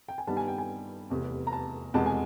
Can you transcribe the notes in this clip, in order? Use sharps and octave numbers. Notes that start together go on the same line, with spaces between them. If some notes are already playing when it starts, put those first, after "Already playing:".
G5
G#5
G2 D#3 G3 B3 A5
G#5
G5
G#5
F1 E2 C3
A#5
A5
F1 E2 B2 G#3 B3 A5
G#5